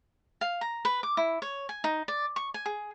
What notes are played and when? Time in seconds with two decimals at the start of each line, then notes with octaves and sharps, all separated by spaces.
0.41 F5
0.61 A#5
0.85 B4
1.03 D6
1.17 E4
1.42 C#5
1.69 G#5
1.84 D#4
2.08 D5
2.36 C#6
2.54 G#5
2.66 G#4